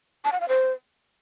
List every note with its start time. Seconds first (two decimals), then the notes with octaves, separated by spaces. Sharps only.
0.25 A5
0.33 F#5
0.41 F5
0.49 C5